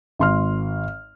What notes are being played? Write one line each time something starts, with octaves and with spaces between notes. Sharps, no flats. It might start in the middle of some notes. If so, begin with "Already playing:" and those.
G#1 C6 F6